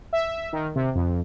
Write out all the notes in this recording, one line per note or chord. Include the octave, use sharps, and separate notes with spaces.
E5
D#3
C3
F2